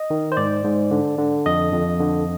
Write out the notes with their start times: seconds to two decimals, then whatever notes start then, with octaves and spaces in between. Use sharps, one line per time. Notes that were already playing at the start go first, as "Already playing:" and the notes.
Already playing: D#5
0.10 D#3
0.32 C5
0.37 G#2 D5
0.64 G#2
0.91 D3
1.18 D3
1.46 F2 D#5
1.73 F2
2.00 D3